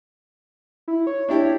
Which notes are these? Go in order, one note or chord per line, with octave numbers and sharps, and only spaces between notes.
E4
C#5
D4 E4 G4